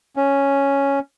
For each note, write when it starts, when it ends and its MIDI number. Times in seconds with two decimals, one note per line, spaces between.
0.16 0.99 61